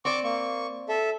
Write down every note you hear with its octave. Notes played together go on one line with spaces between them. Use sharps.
C4 D5 C#6 D6
A#3 C#6
A4 E5